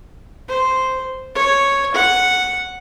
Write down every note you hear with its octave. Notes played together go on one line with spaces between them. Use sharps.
C5
C#5
F#5